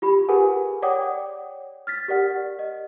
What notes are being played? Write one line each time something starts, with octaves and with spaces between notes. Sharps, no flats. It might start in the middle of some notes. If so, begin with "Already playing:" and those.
F4 G4 B5
G4 G#4 A#4 B4 F#5 G#5
C#5 D5 F#5 G5 D6 D#6
F6 A6 B6
G4 A#4 D5 F#5
D#5